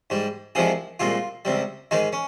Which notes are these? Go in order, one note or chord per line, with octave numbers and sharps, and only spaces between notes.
G#2 G3
C2 C3 F3 G#3 G#4
C2 A#2 G#3 F4
C#2 C3 G3
G#2 D#3 G#3 D#4
C#4